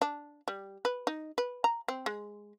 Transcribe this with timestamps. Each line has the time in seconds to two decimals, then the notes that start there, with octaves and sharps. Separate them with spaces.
0.02 D4
0.48 G3
0.85 B4
1.07 D#4
1.38 B4
1.64 A#5
1.88 C4
2.06 G#3